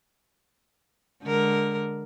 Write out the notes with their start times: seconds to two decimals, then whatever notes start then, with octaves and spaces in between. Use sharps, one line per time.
1.24 D3 G#3 A#4